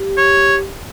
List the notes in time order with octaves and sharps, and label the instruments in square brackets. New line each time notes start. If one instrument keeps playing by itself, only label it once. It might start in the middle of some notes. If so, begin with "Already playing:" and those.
Already playing: [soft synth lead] G4
[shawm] C#5